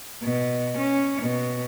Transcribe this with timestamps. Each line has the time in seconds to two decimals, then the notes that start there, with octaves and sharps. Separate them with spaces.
0.22 B2
0.78 C#4
1.22 B2